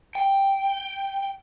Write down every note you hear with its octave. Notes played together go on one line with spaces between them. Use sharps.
G5